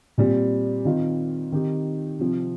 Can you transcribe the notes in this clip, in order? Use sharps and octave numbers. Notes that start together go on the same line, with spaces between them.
A#2 G3 C4
D#3 C4 F4
D#3 C4 D#4 G4
C3 F3 C4